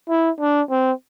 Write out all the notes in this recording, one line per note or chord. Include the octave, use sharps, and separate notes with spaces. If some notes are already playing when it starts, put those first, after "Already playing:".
E4
D4
C4